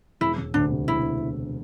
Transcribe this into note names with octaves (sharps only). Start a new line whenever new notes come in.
E1 E4
E1
D2 D4
C3
E1 E4